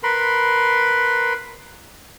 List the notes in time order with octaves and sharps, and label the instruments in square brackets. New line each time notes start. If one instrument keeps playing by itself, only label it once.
[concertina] A#4 B4 B5 C6